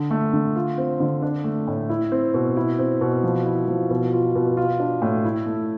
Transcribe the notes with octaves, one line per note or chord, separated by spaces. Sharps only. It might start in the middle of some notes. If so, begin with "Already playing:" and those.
Already playing: D3
A3
D3
F4
C4
D3
D4
A3
A2
E4
C4
B2
E4
C4
B2
F3
E4
F3
B2
F4
B2
F4
D4
A2
E4
A3